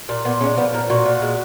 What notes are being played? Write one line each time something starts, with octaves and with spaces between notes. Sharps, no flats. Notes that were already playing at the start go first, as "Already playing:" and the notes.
A#2
A#2 B3
G#3 C#4
F3 B3
A#2 A#4
A#2 F#4
A#2
G#3